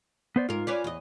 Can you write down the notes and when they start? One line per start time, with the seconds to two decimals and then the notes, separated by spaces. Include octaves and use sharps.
0.36 B3 C5 D5
0.49 G#2 F4 A#4
0.67 C#4 B4 D5
0.84 E2 D#5